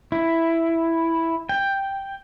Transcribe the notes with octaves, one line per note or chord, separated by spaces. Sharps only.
E4
G5